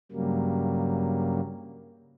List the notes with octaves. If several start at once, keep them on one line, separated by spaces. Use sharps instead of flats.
G2 C#3 F#3 G3 A#3